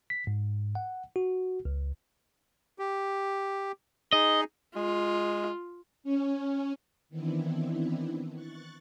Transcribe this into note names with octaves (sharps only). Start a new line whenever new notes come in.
B6
G#2
F#5
F#4
C#2
G4
D#4 G#4 D#5
G#3 F4
C#4
D#3 E3 B3 C4 D4 E4
C#6 F#6 A6